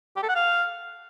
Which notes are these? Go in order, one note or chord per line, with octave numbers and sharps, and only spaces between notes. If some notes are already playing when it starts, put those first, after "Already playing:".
G4
A4
F#5
F5